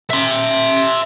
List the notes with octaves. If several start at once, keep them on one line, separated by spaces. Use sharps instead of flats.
E5 C6